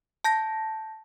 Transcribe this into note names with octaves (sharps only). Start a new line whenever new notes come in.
A5 G6 A#6